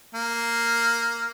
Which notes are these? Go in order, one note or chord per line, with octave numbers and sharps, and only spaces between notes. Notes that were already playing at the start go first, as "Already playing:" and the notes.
A#3